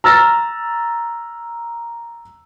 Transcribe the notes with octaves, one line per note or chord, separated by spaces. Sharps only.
A#5 E6 F6 A6 A#6